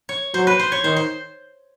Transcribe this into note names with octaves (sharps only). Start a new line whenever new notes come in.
C#5
F#3 C5
B4
C5
C#5
D#3 C5
C5